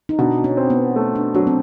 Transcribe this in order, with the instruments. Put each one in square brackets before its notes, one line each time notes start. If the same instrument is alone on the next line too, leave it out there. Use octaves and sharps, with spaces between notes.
[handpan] D#4
[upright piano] B2 [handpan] D4
[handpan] C#4
[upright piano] C4
[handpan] B3
[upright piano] A3
[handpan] D4
[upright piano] F#3 [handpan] D4
[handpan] C4